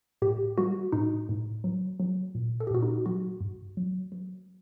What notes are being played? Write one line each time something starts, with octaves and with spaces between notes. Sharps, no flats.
A2 G4
G3 F#4
A2 D#4
A2
F#3
F#3
A#2
A4
G4
A#2 F#4
D#4
F#3 F#4
G2
F#3
F#3